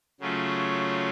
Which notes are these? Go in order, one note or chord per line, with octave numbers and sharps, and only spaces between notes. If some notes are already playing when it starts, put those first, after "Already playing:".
C#3 F#3 A3 C#4 F4